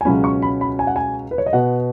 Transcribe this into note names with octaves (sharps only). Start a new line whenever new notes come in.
G#5
C#2 B2 F#3 C#4 B5
C#6
B5
B5
G#5
F#5
G#5
B4
C#5
D#5
B2 B3 F#5